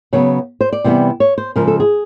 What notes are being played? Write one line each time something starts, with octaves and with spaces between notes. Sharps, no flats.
C#3 F#3 B3 C#5
C5
D5
C3 E3 G3 B3
C#5
C5
C#3 F3 G#3 A#4
A4
G#4